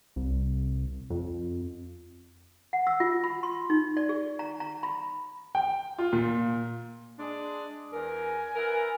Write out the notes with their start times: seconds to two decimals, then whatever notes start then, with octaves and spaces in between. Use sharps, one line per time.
0.16 C2
1.10 F2
2.73 F#5
2.87 E6
3.00 F4
3.24 B5
3.43 C6
3.70 D#4
3.97 D5
4.09 G#4
4.39 A#5
4.60 A#5
4.83 B5
5.55 G5
5.98 F4
6.13 A#2
7.18 G#3 D4
7.93 E2 A#4 G#5
8.56 B3 E4 A#4